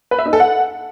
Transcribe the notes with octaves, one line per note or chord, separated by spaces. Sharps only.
B4
E5
D#4
A4
F#5